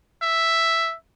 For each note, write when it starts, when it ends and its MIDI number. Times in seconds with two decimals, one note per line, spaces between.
0.22 0.95 76